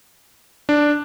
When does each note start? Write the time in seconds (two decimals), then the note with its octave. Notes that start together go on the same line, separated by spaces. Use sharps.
0.69 D4